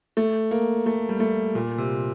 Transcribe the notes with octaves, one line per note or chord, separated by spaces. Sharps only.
A3
A#3
A3
G3
A3
A#2
C3